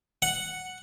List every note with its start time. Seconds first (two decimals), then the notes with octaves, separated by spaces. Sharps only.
0.22 F#5